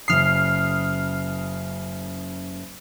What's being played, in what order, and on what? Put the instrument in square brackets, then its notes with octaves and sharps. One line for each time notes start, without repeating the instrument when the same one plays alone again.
[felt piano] F#1 C#3 D#6 [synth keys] F6 C7